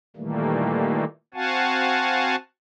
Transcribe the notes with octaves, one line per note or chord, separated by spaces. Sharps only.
A#2 D#3 E3 G3 A3 A#3
C4 F#4 F5 F#5 G#5 A5